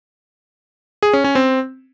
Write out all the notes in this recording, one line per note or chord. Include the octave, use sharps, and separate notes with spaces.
G#4
C#4
C#4
C4